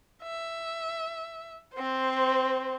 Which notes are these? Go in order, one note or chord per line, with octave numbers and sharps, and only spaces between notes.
E5
C4 C5